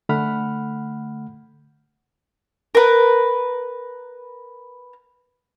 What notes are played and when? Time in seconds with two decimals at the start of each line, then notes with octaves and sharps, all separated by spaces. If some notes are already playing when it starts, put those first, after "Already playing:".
0.09 D3 A3 F#5 B5 F6
2.75 A#4 B4